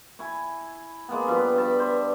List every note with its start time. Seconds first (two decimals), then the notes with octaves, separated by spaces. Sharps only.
0.19 E4 G#5 C#6
1.09 G#3 A#3 B3
1.27 G2 F3 D4 B4
1.56 G2 A5 B5
1.79 C5 E5